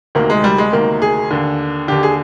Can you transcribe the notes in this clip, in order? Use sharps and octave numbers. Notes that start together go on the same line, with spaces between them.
D2 C3 D#3 A#3
G#3
G3
G#3
D2 C3 D#3 A#3
G#4
D#2 D3
D#2 D3 G4
G#4